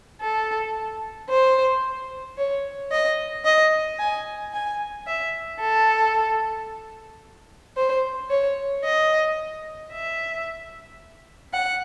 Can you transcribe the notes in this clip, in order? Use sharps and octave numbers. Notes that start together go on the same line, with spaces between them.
A4
C5
C#5
D#5
D#5
G#5
G#5
E5
A4
C5
C#5
D#5
E5
F#5